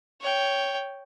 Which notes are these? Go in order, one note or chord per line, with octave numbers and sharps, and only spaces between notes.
C#5 G5